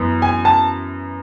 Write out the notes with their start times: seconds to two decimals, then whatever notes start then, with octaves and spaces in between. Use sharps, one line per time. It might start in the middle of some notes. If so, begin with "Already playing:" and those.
Already playing: F#2 E3 B3
0.22 G#5
0.45 A5